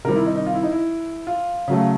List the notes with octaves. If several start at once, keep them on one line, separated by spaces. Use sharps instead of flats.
C3 D#3 G3 C4 A#4
E4
D#4
D#4
F4
E4
D#4
E4
F4
C#3 F#3 A3